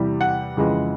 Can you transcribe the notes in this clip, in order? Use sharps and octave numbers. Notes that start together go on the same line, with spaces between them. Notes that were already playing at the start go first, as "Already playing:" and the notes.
Already playing: E2 C3 E3 G3
F#5
F2 C#3 E3 G#3